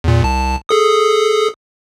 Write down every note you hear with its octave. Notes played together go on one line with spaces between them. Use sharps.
E2 A#2
C2 A5
G#4 A4 D#6